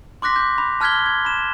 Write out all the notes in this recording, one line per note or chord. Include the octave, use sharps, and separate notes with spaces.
C6 D6 F#6 A#6 B6
G6
B5
A5 F6 F#6 G#6 B6 G7
G#6
B5 E7